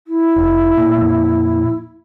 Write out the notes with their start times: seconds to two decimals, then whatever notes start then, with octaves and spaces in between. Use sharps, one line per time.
0.07 E4
0.36 F1
0.77 A#2
0.98 F2 A#2